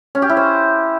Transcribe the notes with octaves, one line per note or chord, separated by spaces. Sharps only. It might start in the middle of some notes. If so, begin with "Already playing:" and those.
C#4
G4
E4
C5